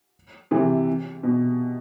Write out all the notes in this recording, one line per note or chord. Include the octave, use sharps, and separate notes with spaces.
C3 E3
B2